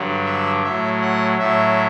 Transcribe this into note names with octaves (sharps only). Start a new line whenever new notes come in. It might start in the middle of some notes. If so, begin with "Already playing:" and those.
Already playing: G2 D3 F#3
E5
A2 F#3 E5
F#5
A2 F#3 E5